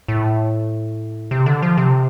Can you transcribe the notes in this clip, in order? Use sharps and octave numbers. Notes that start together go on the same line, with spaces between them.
A2
C3
D3
F3
C3